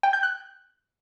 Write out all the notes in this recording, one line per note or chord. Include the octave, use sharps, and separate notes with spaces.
G5
G6
F#6